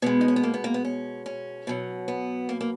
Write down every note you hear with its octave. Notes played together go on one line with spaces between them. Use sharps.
B2 G#3 B3
D#4
C#4
B3
A#3
B3
A#3
B3
C#4
C#4
B2 F#3
B3
A#3
A#3